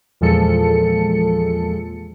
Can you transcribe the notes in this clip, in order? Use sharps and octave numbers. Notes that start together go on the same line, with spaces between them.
E2 A#2 F3 G#3 A4 C#7